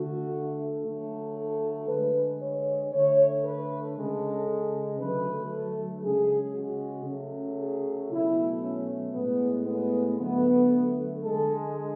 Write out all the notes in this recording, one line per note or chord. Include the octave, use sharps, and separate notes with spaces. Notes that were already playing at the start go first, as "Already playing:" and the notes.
Already playing: D3 A3 F#4
D3 F#3 A3
A4
D3 G#3 B4
C#5
D3 A3 C#5
B4
C#3 G#3 A4
D3 F#3 A3 B4
A4
C#3 G#3 G#4
F#4
C#3 F#3 A3
G#4
B2 F#3 A3 E4
C#4
A2 G#3 B3
B3
D3 F#3 A3 B3
D3 G#3 A4